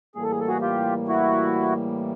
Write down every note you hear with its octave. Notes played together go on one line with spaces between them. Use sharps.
A2 E3 G3 A#3 G#4
A4
G#4
A4
F#4 G#4
F4 G4
E4 F#4